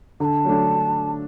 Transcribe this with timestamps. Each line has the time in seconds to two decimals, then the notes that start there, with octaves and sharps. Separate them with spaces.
0.20 D3 A#5
0.25 A5
0.45 F#3 A3 D4